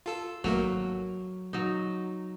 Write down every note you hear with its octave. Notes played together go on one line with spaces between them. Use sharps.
F4 A4 E6
G#1 F#3 A3 A#3
F#3 D#4